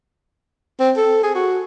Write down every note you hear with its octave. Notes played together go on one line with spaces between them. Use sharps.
C4
A4
G#4
F#4